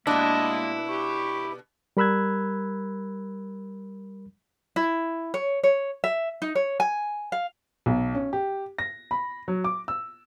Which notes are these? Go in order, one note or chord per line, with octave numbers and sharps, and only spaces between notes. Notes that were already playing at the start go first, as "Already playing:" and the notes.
B2 G3 G#3 A#3 D4 E4 D#5
G4 C#6
G3 A#4 B5 E6 F#6 G#6
E4
C#5
C#5
E5
D#4
C#5
G#5
F5
B1
C#4
G4
A#6
B5
F#3
D6
E6